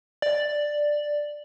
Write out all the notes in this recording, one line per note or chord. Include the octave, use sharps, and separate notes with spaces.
D5